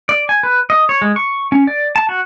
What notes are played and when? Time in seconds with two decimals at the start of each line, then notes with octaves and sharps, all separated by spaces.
0.09 D5
0.29 G#5
0.43 B4
0.70 D#5
0.89 C#5
1.02 G#3
1.16 C#6
1.52 C#4
1.67 D5
1.96 A5
2.09 F#4